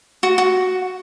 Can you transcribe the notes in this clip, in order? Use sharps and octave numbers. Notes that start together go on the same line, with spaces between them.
F#4
F#4